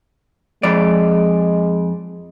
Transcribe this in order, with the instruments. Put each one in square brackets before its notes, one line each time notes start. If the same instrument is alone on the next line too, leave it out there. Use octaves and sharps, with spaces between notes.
[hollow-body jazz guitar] F2 D5 [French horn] G#3